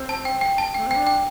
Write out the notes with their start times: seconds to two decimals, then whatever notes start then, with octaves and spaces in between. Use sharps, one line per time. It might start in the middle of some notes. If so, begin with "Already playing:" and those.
Already playing: C4
0.09 A5
0.25 G5
0.41 G5
0.58 A5
0.74 A3 G5
0.87 C4
0.91 G5
0.96 D4
1.07 G5